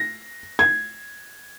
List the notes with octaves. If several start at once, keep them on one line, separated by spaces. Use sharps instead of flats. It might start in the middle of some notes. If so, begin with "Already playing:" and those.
Already playing: A#6
G#6